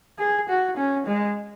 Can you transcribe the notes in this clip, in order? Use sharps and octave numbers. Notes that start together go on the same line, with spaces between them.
G#4
F#4
C#4
G#3